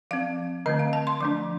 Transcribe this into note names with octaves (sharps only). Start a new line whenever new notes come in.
F3 C4 F5
D3 A3 C4 D#5
F5
A5
C6
F3 A3 D4 C6